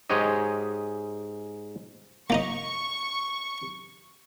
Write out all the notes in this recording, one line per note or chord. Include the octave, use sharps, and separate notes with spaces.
G#2 G#3 G4 C#5 D#5
A#3 D#4 D#5 C#6